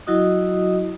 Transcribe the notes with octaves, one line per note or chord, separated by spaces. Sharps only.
F#3 E4 F#4 D#5 D#6